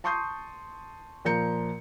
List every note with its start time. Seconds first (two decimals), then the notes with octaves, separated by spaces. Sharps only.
0.04 A5 C6 C#6 D#6 G6 C7
1.25 A#2 F3 A#4 A#5 G6 C#7